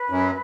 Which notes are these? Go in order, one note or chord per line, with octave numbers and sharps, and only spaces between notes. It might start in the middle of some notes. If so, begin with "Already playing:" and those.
Already playing: B4
F#2